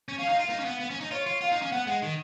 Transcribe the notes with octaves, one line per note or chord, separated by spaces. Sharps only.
C#4
C#4 F5
D#4
F4
D#4
C#4
B3
B3
C#4
D#4
F4 C#5
F4
F4 F5
D#4
C#4
B3 F#5
G#3
D#3